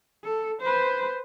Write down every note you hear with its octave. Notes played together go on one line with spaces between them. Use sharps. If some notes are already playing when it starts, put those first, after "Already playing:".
A4
B4 C5